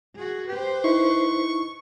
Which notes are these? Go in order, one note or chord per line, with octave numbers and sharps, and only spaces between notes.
F#4 G#4
G4 B4 C5
D#4 E4 C#6